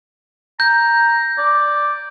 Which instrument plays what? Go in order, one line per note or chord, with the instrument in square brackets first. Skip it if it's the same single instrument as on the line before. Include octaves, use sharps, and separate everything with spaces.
[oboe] A#5 [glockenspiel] G6
[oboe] D5